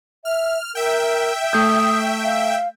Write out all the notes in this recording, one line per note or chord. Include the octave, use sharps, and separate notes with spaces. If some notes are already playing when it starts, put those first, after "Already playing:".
E5 F6
A#4 E5 G5
A3 D#6 G6
F5